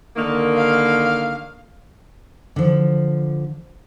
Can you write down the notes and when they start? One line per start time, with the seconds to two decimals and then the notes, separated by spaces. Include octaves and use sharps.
0.16 D3 D#3 A#3
0.57 F5
2.56 D3 F3